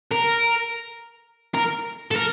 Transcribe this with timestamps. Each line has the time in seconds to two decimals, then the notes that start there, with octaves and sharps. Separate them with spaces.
0.12 A#4
1.54 A#4
2.11 A4
2.16 A#4